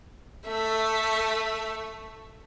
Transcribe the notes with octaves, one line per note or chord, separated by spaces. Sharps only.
A3 E5